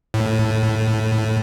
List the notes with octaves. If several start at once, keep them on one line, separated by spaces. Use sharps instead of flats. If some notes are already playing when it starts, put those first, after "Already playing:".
A2